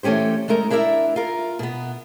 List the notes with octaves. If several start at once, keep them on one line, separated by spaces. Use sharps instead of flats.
E3 A3 C#4 G4 C5
G#3 A3 D#4 A#4
D4 E4 A#4 D5 E5
F4 A#4
B2 B3